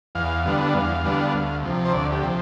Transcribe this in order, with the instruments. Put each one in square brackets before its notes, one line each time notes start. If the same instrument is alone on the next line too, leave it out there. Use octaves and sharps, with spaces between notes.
[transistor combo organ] E2 F5
D3 G3 B3 D4
E2 F5
D3 G3 B3 D4
D2
C3 F3
C5
D2 D5
G4
C3 F3